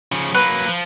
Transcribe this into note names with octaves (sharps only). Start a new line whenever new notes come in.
C#3 F3
F#3 A#3 B4
F3